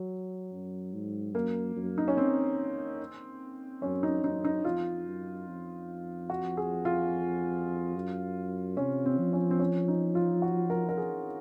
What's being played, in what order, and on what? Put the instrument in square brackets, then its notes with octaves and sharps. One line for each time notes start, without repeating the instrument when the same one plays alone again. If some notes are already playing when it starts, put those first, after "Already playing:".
Already playing: [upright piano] F#3
[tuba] F#2
G#2
[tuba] F#2 [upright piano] A#3
[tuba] F#2
[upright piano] D#4
C#4
C4
[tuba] F#2 [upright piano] C#4
[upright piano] D#4
[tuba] F#2 [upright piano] D#4
[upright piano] D#4
[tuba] F2 [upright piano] F4
[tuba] F#2
F2
[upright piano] F#4
G#4
F4
[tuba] F#2
[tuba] C3 [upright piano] C#4
[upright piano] C4
[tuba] F3
[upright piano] C#4
C4
C#4
D#4
F4
F#4
A#4
A#4
G#4